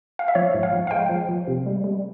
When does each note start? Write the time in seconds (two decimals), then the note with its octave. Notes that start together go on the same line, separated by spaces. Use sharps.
0.19 F5
0.28 E5
0.35 F3 C#5
0.54 G#2
0.63 F5
0.73 F3
0.87 F5
0.91 G#3 G5
1.09 F3
1.29 F3
1.48 C3
1.66 G3
1.84 G3